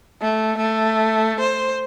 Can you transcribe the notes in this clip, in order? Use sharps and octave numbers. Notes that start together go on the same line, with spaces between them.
A3
A3
C5